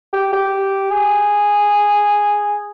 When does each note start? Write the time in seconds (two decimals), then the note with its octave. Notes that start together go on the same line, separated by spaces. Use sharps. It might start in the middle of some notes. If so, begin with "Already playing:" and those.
0.13 G4
0.32 G4
0.91 G#4